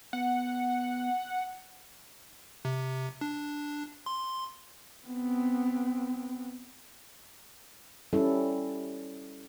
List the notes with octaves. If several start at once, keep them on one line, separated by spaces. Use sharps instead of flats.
B3 F#5
C3
D4
C6
B3 C4
G3 C#4 E4 A4